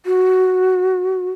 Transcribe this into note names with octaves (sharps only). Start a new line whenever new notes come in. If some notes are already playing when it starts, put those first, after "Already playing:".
F#4